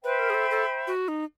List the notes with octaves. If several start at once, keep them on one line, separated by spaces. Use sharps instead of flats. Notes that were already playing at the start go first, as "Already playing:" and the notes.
B4 C5 E5 G5 B5
A#4
G#4
A4
A4
F#4
D#4